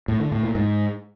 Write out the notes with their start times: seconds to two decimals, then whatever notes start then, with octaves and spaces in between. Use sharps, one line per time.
0.08 A2
0.20 D3
0.32 A2
0.43 A#2
0.55 G#2